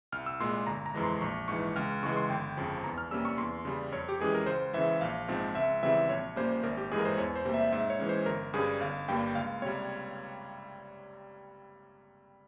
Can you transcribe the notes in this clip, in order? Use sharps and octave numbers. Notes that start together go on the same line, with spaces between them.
C2 F6
E6
A#2 G#3 C6
C6
G1 A#5
A#5
F2 E3 G#3
C6
A#1 C#6
G#2 E3 C#6
C#2 F6
C#3 E3 G#3 C#6
C6
G1 G5
F2 C#3 F3
E2 A#5
F6
C3 G3 A#3 C#4 E6
C#6
E2 C6
C#3 G3
F2 C#5
G4
E3 G#3 C#4 G#4
A#4
C#2 C5
C#3 E3 E5
A#1 F5
G#2 F3 C4
C#2 E5
C#3 E3 G3 C4 E5
A#1 C#5
A#2 G3 A#3 C#4 C5
G#1 A#4
G4
G2 E3 G#3 G#4
A#4
C5
E2 C#5
C5
C3 G3 A#3
E5
G#2 E5
C#5
E3 G#3 C#4
C5
G1 A#4
G2 G3 C#4 G#4
G1 F5
G2 G3 A#3 G5
C#2 F5
C3 G3 C#5